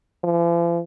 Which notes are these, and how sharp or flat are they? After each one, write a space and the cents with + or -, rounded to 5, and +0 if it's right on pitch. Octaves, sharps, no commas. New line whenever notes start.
F3 -45